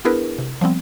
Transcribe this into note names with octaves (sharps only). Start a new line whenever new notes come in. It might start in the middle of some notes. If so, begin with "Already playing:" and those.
B3 D4 E4 G#4 A#4 B4
C3
F3 G3 B3 C4